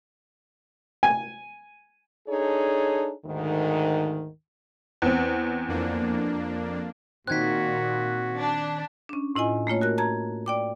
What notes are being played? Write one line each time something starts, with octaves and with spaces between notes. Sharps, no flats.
G#5
D4 D#4 G#4 A4 C#5
D2 G#2 D#3
E2 C4
F2 A#3 D4
A#2 D#3 C4 F#4 F#6 G#6 B6
D4
C#4 D4
A2 E4 F4 D#5 G#5
A3 A#3 F4 C#5
F#4 A#4 F#6
A5 A#5 G#6
D5 G5 D6